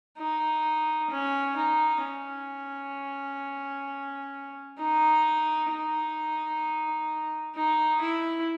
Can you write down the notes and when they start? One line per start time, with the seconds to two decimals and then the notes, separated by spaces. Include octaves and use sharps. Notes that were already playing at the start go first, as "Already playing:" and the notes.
0.18 D#4
1.10 C#4
1.56 D#4
2.03 C#4
4.79 D#4
5.70 D#4
7.55 D#4
8.00 E4